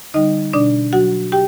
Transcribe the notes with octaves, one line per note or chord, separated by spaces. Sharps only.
D3 G3 D#4 D#5
B2 D4 D5
F#3 F#4 F#5
G4 G5